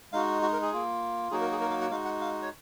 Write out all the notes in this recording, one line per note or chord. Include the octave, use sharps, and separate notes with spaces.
G#3 D#4 F#4 F5
F#4
A#4
G#4
A#3 F4
F#3 A#3 D#4 F#4 G#4
A#4
G#4
A#4
F5
F#5
G#3 D#4 F#4 F5
F#5
F5
C#5